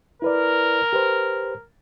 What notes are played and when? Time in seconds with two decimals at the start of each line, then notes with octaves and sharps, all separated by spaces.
0.22 E4 A#4 B4 D5
0.93 G4 B4 C5